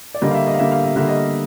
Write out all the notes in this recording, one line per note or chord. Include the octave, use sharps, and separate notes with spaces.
D5
D3 G3 A#3 D#5
F5
E5
D#5
F5
D3 G3 A#3 E5
F5
E5
D3 G3 A#3 E5
D#5